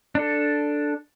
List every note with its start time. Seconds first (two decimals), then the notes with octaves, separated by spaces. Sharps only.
0.15 D4 A4